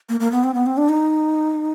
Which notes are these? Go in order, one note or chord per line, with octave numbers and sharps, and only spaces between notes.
A#3
A#3
B3
C4
B3
C4
D4
D#4